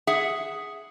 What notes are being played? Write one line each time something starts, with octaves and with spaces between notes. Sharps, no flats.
G#4 E5 F#5